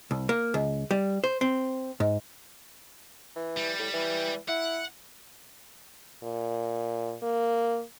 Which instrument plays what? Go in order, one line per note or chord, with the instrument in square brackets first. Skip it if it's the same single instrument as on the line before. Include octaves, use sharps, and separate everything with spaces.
[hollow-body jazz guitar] C2
A#3
C#2
G3
C5
C4
G#2
[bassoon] E3
[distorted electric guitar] G3
[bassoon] A2
E3
[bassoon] E4 [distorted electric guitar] F#5
[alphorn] A#2
A#3